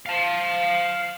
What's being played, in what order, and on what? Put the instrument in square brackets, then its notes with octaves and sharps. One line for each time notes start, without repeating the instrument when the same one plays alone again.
[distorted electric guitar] F5 A5